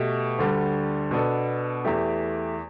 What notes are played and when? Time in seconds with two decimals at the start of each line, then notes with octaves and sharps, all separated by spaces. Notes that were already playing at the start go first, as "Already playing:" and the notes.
Already playing: B2 A3 G4
0.39 D2 D3 G3
1.11 B2 B3 D4 A4
1.85 E2 E3 A3 G4